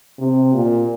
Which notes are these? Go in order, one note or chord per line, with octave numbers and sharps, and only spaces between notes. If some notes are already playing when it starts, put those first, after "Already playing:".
C3
A#2